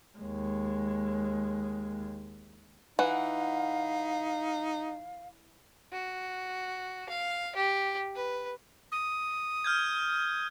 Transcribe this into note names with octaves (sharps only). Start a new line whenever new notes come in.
D#2 G#3
E3 D#4 F5 F#5
F#4
F5
G4
B4
D#6
F6 G6 G#6